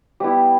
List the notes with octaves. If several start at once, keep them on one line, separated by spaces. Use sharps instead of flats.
G3 B3 E4 G4